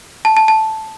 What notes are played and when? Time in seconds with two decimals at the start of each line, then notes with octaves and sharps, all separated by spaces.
0.25 A5
0.37 A5
0.48 A5